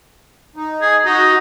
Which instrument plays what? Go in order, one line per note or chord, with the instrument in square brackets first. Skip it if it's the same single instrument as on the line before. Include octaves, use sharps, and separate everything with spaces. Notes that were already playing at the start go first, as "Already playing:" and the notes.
[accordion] D#4
[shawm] G#4
[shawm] D#4 [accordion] F#4